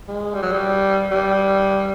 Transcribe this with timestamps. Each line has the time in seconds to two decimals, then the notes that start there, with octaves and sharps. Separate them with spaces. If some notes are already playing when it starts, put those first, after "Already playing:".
0.09 G#3
0.34 G3
0.43 F#3
0.52 G3
1.11 G3